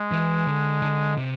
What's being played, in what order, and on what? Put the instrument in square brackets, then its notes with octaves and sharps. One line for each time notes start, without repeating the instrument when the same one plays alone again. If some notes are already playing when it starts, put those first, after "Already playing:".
Already playing: [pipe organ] G#3
[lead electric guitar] E3
D3
D3
C3